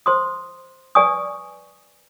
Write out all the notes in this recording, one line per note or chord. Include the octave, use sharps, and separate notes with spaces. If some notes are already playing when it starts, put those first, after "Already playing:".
C5 C6 D#6
B4 D5 G#5 C#6 D#6